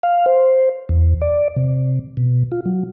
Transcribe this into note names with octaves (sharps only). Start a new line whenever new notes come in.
F5
C5
E2
D5
C3
B2
F4
F#3